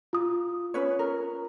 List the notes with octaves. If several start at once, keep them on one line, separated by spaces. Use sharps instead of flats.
F4 D#6
C#4 B4 C#5
A#4